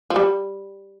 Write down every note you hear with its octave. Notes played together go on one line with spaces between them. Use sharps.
F3
G3